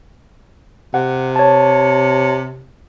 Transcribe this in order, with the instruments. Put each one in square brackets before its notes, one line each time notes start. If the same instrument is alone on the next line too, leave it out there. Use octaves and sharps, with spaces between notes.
[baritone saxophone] C3 [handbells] F#5
[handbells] C#5 A5